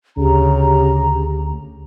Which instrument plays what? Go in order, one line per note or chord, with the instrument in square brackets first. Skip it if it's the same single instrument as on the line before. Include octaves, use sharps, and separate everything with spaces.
[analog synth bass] D2 [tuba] C#3 [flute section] G4 A#5